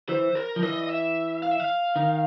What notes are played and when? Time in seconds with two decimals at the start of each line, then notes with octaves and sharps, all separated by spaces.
0.09 E3 C5
0.35 A#4
0.56 F3
0.63 E3 D#5
0.83 D#5
0.89 E5
1.42 F5
1.51 E5
1.60 F5
1.96 D#3